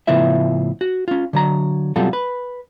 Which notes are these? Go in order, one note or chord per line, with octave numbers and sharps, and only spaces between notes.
A2 C#3 F3 B3 E4 E5
F#4
C#4 F4
D3 F#3 A#5
B2 F#3 G3 C4 F4 A4
B4